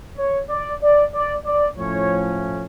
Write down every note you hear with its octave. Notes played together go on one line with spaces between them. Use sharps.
C#5
D5
D5
D5
D5
A2 F3 C#4 C#5